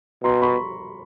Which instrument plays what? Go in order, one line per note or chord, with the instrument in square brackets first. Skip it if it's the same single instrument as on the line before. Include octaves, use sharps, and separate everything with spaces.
[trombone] B2 [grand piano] A#5 C6
[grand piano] B5 C#6